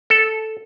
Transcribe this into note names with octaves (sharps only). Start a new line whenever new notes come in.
A4